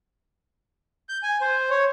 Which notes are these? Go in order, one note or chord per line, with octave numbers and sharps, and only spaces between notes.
G6
G#5
C5
C#5